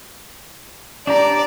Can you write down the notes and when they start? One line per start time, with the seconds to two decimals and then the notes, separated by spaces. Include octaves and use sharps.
1.07 D4 G4 D5 A#5